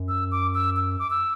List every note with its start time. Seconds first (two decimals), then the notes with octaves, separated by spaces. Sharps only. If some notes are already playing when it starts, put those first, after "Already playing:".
Already playing: F#2
0.09 E6
0.32 D6
0.54 E6
0.76 E6
0.99 D6
1.10 E6